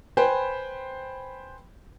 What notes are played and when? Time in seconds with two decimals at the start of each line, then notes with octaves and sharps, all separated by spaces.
0.17 B4 C5 G5 G#5 B5